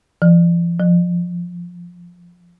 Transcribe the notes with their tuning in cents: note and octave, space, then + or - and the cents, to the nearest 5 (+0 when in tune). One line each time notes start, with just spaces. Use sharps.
F3 -40
F3 +5